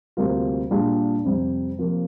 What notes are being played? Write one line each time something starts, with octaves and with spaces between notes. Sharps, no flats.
D2 C3 G3 A#3 F4
A#2 G3 D4 F4 G#4
F2 C3 G3
C3 F3 A#3